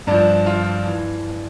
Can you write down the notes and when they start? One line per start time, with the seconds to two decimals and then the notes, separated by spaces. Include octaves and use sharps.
0.07 G2 F3 D4
0.46 F4
0.86 E3